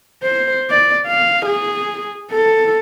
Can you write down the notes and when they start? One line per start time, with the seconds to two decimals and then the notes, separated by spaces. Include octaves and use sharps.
0.23 C5
0.70 D5
1.07 F5
1.46 G#4
2.31 A4